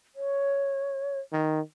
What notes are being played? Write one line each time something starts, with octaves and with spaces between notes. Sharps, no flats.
C#5
D#3